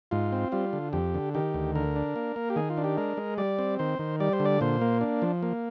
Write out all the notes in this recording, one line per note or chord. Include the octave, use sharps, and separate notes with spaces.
G#2 F4
C4
G3 F4
D3
F2 G4
D3
D#3 G4
D2
D3 A#4
D4
A#3
A#3
G4
D#3 G#4
F4
D4
G4
G#3 A#4
G#3
G3 D5
C4
D#3 C5
D#3
G3 D5
C5
D3
D5
A#2 C5
A#3
D4
F3
A#3